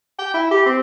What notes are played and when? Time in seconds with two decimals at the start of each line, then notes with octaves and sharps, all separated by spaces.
0.19 G5
0.34 E4
0.51 G4
0.66 C4